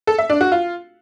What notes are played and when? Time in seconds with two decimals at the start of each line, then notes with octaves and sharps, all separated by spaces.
0.07 A4
0.18 E5
0.30 D4
0.41 F#4
0.52 F4